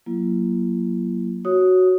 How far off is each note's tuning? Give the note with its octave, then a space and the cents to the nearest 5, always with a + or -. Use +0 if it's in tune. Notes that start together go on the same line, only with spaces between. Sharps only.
F#3 -5 A#3 +15 E4 +45
F#4 +0 C#5 +0 D#6 +5